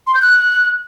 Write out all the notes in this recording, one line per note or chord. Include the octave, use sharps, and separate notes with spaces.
C6
G6
F#6